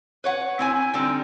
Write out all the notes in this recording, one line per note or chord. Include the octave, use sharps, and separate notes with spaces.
B4 C#5 F#5
C4 E4 G#5
D3 G3 C4 D#4